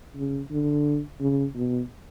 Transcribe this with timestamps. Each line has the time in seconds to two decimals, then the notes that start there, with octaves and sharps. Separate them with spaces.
0.16 C#3
0.51 D3
1.20 C#3
1.56 B2